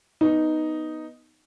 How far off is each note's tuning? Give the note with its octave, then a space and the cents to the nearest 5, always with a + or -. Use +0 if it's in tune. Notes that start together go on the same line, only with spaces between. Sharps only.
B3 +0 D#4 +0